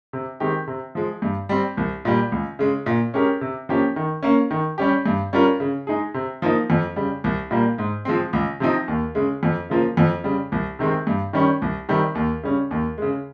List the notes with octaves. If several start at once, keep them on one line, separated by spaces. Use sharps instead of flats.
C3
D#3 G#3 C4 G4
C3
F3 G#3
G2
G3 C4
C2
A#2 G3
C#2
C#3 G#3
A#2
G#3 C#4 G4 A#4
C3
F3 A#3 C#4 G4
D#3
A#3 C#4
D#3
G3 C#4 G4
G2
G3 C#4 F4 A#4
C#3
G#3 D#4 G#4
C3
F3 A#3 D#4
F2
C#3 G3
C2
A#2 G3 A#3
G#2
F3 G#3 C4
C#2
C3 F3 C4 D#4
D#2
C#3 G#3
F2
C#3 F3 A#3 F4
F2
C#3 G3
C2
C3 D#3 G#3 C4
G2
D#3 G3 C#4
C2
C3 D#3 G3
D#2
C#3 G3 C#4
D#2
C#3 G#3